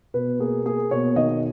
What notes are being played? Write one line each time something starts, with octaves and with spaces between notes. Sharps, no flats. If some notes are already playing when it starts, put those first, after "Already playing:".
B2 B4
A#3 G#4
A#3 G#4
B2 C#5
D#3 D#5